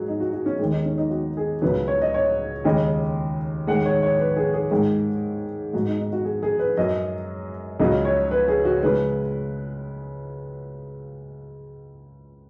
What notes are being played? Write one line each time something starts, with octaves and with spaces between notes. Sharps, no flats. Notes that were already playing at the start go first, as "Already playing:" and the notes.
Already playing: G#2 F#3 F#4 G#4
D#4
F#4
F#4
C#4
D#2 D#3 G#3 D#4
D#4
C#4
D#4
F#4
G#4
C#2 C#3 F#3 B4
C#5
D#5
C#5
D#2 C#3 G#3 D#5
D#2 D#3 G#3 F#5
C#5
C#5
B4
G#4
G#4
G#2 D#3 G#3 G#4
G#2 G#3 F#4
D#4
D#4
F#4
G#4
G#4
B4
F#2 F#3 D#5
C#2 C#3 F#3 D#5
C#5
B4
G#4
F#4
C#3 G#3 B4